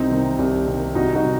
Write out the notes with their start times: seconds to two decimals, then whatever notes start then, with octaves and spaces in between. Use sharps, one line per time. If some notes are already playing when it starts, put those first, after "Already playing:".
Already playing: C2 C4 D#4
0.11 C3 D#3
0.39 C2
0.67 C3 D#3
0.95 C2 D#4 F#4
1.15 D#4 F#4
1.24 C3